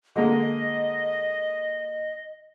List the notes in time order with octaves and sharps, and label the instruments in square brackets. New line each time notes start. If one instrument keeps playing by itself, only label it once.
[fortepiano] D3 G#3 A#3 [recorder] D#5